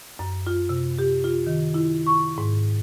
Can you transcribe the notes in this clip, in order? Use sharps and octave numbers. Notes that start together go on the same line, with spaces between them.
F#2
F4
C3
G4
F4
D#3
E4
C#6
G#2